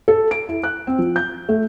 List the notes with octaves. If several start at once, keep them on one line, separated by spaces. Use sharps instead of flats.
A4
D7
E4
F#6
C4
F3
G6
A3